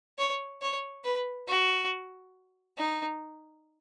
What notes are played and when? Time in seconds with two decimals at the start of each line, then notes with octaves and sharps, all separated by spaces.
0.18 C#5
0.62 C#5
1.04 B4
1.48 F#4
2.77 D#4